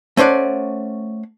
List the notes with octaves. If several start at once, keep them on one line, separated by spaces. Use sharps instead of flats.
A3 C#4 C5 D5 F#5